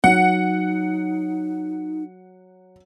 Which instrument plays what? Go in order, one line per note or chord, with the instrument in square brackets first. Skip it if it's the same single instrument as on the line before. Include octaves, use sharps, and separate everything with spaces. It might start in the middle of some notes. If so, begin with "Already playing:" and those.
[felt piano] F#3 [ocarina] D#4 [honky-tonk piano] F#5